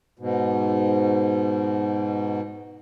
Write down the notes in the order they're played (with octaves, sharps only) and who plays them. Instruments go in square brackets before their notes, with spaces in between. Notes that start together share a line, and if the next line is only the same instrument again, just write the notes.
[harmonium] G#2 B2